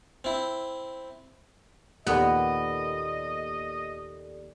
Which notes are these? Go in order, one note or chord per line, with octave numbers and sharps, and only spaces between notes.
C4 E4
D#2 A#2 B3 G4 A4 D5 D#5